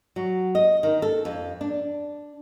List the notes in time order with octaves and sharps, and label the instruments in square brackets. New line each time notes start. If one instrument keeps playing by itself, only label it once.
[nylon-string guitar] F#3
D#5
D#3
A4
F2
D4